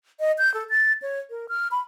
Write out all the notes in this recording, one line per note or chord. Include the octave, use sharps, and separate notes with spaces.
D#5
G6
A4
A6
C#5
A#4
F6
B5